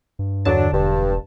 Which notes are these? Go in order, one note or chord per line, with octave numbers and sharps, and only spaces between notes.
G2
E2 D3 F#3 D4 A5
E1 G2